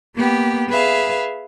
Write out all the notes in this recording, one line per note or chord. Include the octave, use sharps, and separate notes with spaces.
A#3 B3 G4
G#4 B4 E5 F5